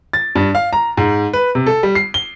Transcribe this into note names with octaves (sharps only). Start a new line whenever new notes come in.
A6
G2
F5
A#5
G#2
B4
C3
A4
G3
C7
G7